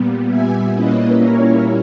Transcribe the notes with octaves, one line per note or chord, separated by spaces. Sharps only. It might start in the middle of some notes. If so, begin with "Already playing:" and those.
Already playing: A#2 G3 B3
E5 G#5
A#2 G3 A#3 C#4 E4 B4 D#5
A#4 C#5